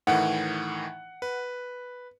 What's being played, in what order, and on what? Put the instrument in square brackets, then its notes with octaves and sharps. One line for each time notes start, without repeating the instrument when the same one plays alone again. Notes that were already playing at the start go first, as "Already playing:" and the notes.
[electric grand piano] A2 D#3 E3 [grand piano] F#5
[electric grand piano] B4